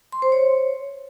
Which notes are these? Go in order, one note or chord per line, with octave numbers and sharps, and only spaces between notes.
C6
C5
C#5